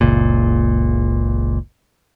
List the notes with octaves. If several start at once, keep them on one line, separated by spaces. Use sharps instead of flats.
F#1 C#2 A#2